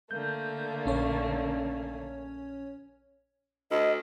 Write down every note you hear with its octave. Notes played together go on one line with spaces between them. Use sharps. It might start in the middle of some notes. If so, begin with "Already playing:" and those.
D3 A3 A#3 G6
A#1 C#4 C#5
D2 D#5